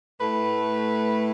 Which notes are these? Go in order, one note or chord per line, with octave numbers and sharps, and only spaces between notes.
A2 A3 B4